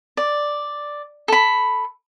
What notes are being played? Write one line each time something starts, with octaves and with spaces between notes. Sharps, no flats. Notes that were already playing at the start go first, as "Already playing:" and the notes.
D5
A4 B5